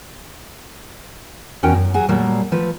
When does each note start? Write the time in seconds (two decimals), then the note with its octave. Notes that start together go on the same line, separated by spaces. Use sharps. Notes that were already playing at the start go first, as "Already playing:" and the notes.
1.63 E2 C#4 F#4 A#4 G5
1.74 F#2
1.94 F#3 F#4 G#4
2.08 A#2 F#3 G3 A3 A#3
2.52 F3 A3 B4